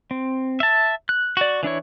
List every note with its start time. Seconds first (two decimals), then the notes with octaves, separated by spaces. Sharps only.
0.11 C4
0.60 E5 A5
1.09 F#6
1.37 F#4 D5
1.63 E3 D4 E4 C#5